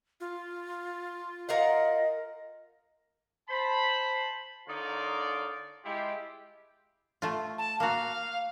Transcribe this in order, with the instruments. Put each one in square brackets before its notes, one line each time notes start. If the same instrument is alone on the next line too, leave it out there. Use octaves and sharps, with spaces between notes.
[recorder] F4
[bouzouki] A#4 F5 F#5 [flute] D#5
[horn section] C5 A5 B5
D3 D#4 F4 A#4 C#5 D5
G#3 E4 F4 G4
[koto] A3 F4
[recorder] A5
[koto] A#3 F#4 [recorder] F5